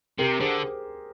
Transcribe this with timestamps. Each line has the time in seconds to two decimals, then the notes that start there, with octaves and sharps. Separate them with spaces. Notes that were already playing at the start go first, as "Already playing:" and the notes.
0.19 C3 G4 A#4
0.40 D3 G#4 C5